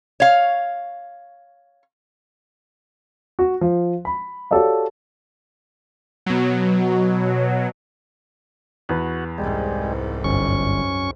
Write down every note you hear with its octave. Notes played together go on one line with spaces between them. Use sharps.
C#5 F5
F#4
F3
B5
F#4 G4 A4 C#5 D5 F5
B2 F#3
E2 F#4 B4
C2 G#2 G3 G#3
G1 F#2 C#4 C#6